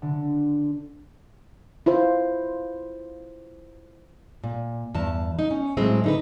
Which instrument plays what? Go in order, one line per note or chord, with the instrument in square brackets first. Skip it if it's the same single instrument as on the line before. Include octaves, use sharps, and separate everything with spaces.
[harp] D3
[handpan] E4 F4 C5
[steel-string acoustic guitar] A#2
E2 G2 A5
D#4
C#4
A2 F#3 G#3 C4 E4
D3 D#4 B4